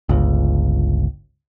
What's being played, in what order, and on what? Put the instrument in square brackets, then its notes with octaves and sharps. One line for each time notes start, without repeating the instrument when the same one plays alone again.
[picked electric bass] G1 C#2